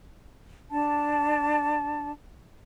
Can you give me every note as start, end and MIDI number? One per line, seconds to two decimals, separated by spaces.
0.71 2.11 62
0.71 2.11 81